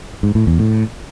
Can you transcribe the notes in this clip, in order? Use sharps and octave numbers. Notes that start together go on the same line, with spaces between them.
G#2
A2
E2
A2